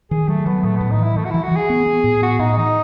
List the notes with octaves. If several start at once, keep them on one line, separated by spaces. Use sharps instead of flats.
D#3 G#4
F#3 A3
F#3 B3
A2 A3
A2 B3
D#4
E3 E4
E3 A3
F#4
E3 E4
F#4
E3 G#4
B3
B3
A2
B3 F#4
A2 D#4
E3 D#4